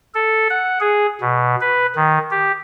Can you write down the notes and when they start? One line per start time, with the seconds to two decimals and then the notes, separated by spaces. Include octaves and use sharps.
0.15 A4
0.50 F#5
0.81 G#4
1.21 B2
1.61 B4
1.96 D#3
2.31 G4